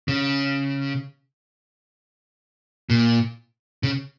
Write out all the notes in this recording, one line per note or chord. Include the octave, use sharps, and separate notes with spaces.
C#3
A#2
C#3